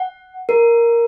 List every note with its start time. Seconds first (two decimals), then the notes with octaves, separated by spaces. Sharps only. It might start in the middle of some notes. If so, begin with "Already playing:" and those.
Already playing: F#5
0.49 A#4